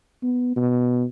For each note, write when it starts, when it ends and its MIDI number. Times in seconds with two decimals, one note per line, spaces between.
0.23 0.54 59
0.56 1.04 47